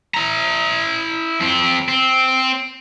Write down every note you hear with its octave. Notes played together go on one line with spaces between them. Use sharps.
E4 A#5
F2 C4
C4